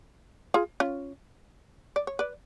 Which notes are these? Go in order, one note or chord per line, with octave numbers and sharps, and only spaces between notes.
F4 G#4
C#4 F4
D5
C#5
B4 D5